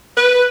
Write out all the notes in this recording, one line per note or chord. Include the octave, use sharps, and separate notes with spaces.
B4